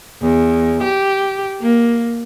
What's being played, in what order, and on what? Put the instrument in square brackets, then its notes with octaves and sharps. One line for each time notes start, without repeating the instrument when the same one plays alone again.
[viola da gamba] E2
G4
A#3